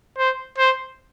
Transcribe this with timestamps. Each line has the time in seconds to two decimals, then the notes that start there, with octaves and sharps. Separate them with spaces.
0.18 C5
0.58 C5